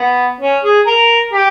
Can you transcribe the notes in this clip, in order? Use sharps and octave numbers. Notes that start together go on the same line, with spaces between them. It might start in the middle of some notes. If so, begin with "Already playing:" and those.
Already playing: B3
C#4
G#4
A#4
G4